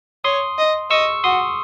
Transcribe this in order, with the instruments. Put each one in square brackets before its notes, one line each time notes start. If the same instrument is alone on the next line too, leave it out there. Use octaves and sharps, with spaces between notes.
[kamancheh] C#5 [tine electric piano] C6 D#6
[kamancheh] D#5
[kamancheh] D#5 [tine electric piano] C#6 E6
[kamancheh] F#4 [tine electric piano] C6 D#6